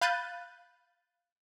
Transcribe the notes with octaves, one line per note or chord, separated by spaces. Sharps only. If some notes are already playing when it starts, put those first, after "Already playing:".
F5 B5 F#6 G6 A6 D#7